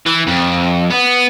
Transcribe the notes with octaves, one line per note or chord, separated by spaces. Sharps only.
E3
F2
B3